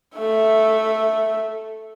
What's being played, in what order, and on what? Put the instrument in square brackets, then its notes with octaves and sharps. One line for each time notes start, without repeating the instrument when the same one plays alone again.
[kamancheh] A3 E5